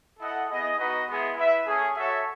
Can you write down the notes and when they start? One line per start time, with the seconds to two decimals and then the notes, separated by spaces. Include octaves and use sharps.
0.19 E4 A4 D#5 F#5
0.49 B3 E4 G#4 D#5
0.78 B3 D#4 F#4 B4 D#5
1.07 G#3 B3 E4 G#4
1.36 E4 B4 E5
1.66 A3 C#4 G#4
1.96 F#4 A4 C#5 E5